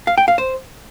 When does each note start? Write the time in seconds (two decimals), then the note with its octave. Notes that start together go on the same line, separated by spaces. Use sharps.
0.07 F5
0.18 G5
0.28 F5
0.38 C5